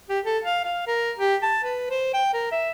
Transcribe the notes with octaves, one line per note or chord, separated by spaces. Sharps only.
G4
A4
F5
F5
A#4
G4
A5
B4
C5
G5
A#4
E5